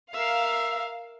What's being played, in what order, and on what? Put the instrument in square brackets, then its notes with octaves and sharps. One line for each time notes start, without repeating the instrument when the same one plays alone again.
[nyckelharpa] A#4 E5 [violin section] F5